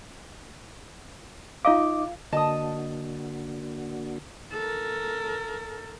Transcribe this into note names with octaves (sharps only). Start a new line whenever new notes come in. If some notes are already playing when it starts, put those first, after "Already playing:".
D#4 F4 D#5 F5 D6
D3 A#3 D4 F#4 D#5 A5 D#6
A4 A#4